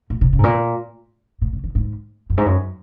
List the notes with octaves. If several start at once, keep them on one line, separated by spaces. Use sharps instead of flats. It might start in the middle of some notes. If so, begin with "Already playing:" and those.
A#2
C3
C#3
G#2
A#2
A#2
C#3
D#3
G#2
F#2
G#2
F#2